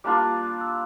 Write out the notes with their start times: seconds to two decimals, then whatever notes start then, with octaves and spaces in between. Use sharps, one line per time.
0.04 G3 A#3 D4 F4 D6
0.42 F#6
0.61 E6